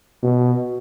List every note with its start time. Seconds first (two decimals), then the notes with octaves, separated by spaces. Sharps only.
0.23 B2